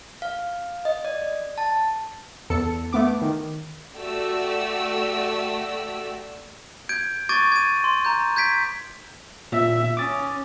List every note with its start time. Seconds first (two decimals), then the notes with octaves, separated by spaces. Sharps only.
0.22 F5
0.85 D#5
1.05 D5
1.58 A5
2.50 E2 A4 A5 C#7
2.93 A3 B3 D6
3.21 D#3
3.96 A3 F#4 G4 D5 E6
6.89 G6 G#6 D7
7.29 C#6 D6 G#6 A6 D7 D#7
7.52 G#6 D#7
7.84 C6
8.05 A#5 G6
8.36 G6 G#6 B6 D7
9.52 A#2 E5
9.97 C#4 D6 D#6 A6